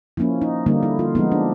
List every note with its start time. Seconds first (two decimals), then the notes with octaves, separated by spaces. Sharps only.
0.17 F3 A#3 C#4 E4
0.41 D#4
0.66 D3 G3 A#3 D#4
0.83 E4
0.99 F4
1.15 F3 G#3 B3 D#4
1.32 D4